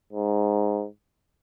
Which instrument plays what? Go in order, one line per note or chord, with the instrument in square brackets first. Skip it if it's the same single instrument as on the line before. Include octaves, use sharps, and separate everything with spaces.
[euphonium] G#2